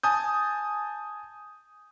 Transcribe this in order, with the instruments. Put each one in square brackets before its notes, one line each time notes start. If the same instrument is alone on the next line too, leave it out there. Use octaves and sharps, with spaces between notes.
[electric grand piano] G#5 A5 D#6 G6